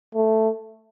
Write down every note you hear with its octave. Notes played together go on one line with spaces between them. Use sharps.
A3